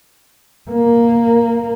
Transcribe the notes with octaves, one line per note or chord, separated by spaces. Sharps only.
A#3